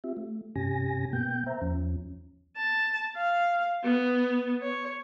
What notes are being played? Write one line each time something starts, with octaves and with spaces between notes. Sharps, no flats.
C4 F4 G4 E5
A3
G2 C3 C#4 G4 G#5 A#6
B2 A#3 B3 G5 G6
C5 E5 A#5
E2 F3 C#4
A5
F5
B3
C#5